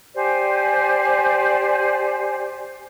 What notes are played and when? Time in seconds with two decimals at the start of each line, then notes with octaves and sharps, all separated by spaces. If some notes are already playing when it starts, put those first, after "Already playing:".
0.15 G4 C5 D5 G#5